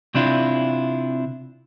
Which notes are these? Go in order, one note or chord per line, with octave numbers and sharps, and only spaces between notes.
C3 C4 D4 E4 F4